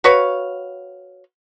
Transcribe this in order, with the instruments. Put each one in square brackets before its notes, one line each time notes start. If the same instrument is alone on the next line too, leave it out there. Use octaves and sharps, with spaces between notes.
[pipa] F#4 B4 C#5 F5